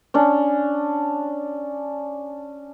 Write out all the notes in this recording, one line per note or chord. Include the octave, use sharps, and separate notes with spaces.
C#4 D4